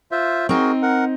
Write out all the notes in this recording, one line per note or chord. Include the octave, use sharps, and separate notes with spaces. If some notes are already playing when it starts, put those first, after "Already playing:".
F4 C5 E5
C4 D#4 F#4 G#4 A#4
A#4 F#5